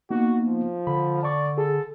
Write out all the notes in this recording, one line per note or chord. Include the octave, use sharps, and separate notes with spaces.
A#3 B3 D#4 F#4
F3
D3 B5
D5 A5 C#6 D6
G#4 A4